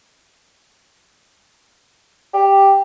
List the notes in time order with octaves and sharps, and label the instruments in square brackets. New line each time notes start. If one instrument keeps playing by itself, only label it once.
[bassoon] G4